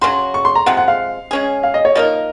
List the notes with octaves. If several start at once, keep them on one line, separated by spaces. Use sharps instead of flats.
C#3 F#3 C#4 F#4 C6
C#6
C6
A#5
C3 F3 G#3 F#5
F#5
F5
G#3 C#4 G#4
F5
D#5
C#5
F3 A#3 D#4 A#4 D#5